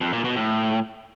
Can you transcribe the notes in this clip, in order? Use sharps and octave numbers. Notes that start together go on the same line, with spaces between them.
F2
A#2
B2
A2